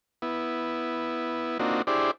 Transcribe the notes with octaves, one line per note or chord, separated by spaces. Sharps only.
B3 E4
A#3 C4 D4 D#4 F4 F#4
D4 E4 G4 G#4 C5 D5